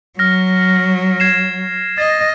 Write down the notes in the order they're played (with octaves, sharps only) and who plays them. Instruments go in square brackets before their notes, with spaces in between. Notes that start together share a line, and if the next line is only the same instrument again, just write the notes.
[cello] F#3 [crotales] F6 A#6
[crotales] G#6 C7 E7
[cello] D#5 [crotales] A6 A#6